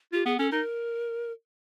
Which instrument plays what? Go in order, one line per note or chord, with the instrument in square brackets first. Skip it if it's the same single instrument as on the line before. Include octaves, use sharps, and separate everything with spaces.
[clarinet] F4 [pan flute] G4
[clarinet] B3 [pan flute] G#4
[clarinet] C#4 [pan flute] A4
[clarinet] D#4 [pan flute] A#4